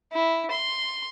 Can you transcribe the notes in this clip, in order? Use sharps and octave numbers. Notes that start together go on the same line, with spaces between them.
E4
C6